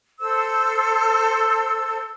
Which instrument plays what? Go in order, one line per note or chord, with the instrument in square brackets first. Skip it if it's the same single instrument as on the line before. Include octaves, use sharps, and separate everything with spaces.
[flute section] A4 C5 E6